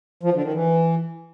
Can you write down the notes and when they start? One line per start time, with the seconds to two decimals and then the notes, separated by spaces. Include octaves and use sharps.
0.23 F3
0.33 D3
0.43 D#3
0.54 E3